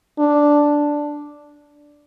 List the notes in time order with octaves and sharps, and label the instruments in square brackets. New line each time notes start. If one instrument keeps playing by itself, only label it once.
[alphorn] D4